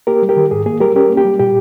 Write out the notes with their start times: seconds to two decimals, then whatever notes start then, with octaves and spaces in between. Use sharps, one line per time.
0.07 A#3 G4 A#4
0.22 G3
0.29 G4 A#4
0.36 D#3
0.51 G#2 G#4
0.66 A#3 G#4
0.80 G3 G4 A#4
0.96 C#4 G4 A#4
1.10 A#3
1.17 G4
1.25 G3
1.40 A#2 G4